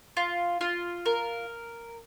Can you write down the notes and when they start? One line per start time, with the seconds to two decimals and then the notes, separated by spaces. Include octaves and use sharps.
0.17 F4
0.61 F4
1.06 A#4